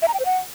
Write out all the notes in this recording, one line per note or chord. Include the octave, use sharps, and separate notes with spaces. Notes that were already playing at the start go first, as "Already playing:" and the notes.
E5
A#5
G5
C5
F#5